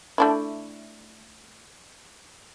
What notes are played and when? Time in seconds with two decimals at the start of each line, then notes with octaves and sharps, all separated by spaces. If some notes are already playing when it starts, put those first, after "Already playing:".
0.18 A3 D4 E4